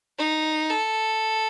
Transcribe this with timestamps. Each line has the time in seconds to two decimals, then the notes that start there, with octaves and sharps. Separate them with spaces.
0.19 D#4
0.70 A4